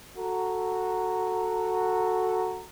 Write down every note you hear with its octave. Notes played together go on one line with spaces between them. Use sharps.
F#4 A4 A#5